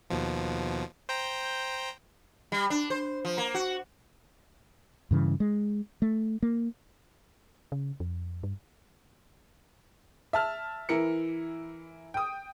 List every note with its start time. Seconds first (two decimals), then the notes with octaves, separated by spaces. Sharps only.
0.10 D#2 B2 F3
1.09 C5 G5 A#5
2.52 G3
2.70 D4
2.90 C5
3.25 F3
3.38 A#3
3.55 F#4
5.11 G2 C#3 E3
5.40 G#3
6.02 A3
6.43 A#3
7.72 C#3
8.00 F2
8.43 G2
10.33 E5 A5 F6
10.89 E3 E4 A#4 C#7
12.14 G5 D#6